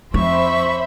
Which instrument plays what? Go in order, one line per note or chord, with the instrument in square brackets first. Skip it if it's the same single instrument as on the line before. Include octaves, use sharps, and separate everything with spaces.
[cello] F2 [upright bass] F4 [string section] C5 E5 B5 [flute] C#6